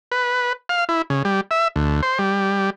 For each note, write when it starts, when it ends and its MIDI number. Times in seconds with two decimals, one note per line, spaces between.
0.12 0.53 71
0.69 0.84 77
0.89 1.02 64
1.10 1.23 49
1.25 1.41 55
1.51 1.68 76
1.76 2.01 38
2.03 2.19 72
2.19 2.70 55